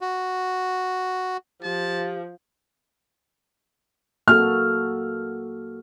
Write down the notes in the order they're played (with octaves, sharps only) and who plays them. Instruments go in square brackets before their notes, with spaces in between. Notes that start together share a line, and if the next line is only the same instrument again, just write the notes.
[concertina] F#4
[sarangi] F3 [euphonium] G4 [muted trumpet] A5
[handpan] A#3 F#4 A4 [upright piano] F6